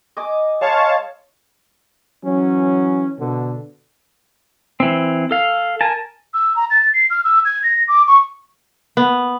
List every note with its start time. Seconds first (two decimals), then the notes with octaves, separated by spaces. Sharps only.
0.17 D#5 G#5 D6
0.61 G#3 C#5 F5 A5
2.23 E3 F#3 C#4
3.19 B2 D3
4.80 E3 C4
5.31 A4 F5
5.81 A#4 G#5 A5
6.34 E6
6.56 A#5
6.70 A6
6.94 C7
7.10 F6
7.24 E6
7.45 G#6
7.63 A#6
7.88 D6
8.07 C#6
8.97 B3